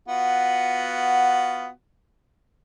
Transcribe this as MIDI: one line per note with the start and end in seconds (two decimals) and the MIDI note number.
0.08 1.67 59
0.08 1.67 65
0.08 1.67 66